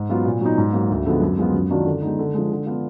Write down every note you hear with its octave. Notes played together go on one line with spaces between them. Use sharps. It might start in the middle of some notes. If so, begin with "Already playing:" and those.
Already playing: G#2
F#3 B3 F4
A#2
F#3 B3 D#4
G#2
F#3 A#3
D2
D3 F3 G#3 B3
F#2
F3 G#3 B3 F4
F#2
D#3 F#3 D4 F4
D3
G#3 B3 D#4
D3
F3 G#3
D3
F3 B3 D4 F4